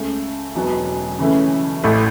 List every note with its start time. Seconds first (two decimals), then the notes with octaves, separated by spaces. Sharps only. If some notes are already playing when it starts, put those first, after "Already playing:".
Already playing: C#2 C#3 A3
0.55 E1 E2 B2 F#3 B3
1.19 C#3 E3 A3 C#4
1.84 A1 A2 A3 E4